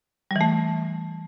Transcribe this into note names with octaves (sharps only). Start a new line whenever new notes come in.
E3 G3 A3